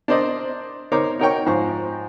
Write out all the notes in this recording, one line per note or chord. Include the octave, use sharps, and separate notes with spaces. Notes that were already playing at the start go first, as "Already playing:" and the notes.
D4 A#4 C5 D5 D#5
D#4 A#4 C5 C#5 D6
D#4 F#4 A#4 C#5 G5 C#6
G#2 F3 C5 C#6